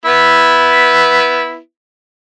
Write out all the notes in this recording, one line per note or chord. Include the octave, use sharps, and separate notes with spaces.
B3 E4